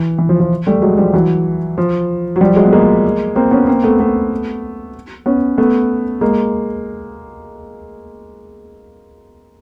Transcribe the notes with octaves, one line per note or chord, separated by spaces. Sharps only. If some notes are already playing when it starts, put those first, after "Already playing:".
Already playing: E3
E3
F3
F3
G3 A3
F#3 G#3
F3 G3
E3 F#3
F3
F#3
F3 G3
F#3 G#3
B3
G#3 A#3
A#3 C4
B3 C#4
A#3 C4
A3 B3
A3 B3
B3 C#4
A3 B3
G#3 A#3